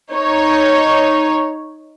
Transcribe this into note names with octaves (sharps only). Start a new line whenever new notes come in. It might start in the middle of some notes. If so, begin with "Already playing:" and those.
D#4 C#5